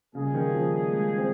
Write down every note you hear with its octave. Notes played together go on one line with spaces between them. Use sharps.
A#2 C#3 G3 A#3 D#4 G#4
D#3
F3
G#3
C4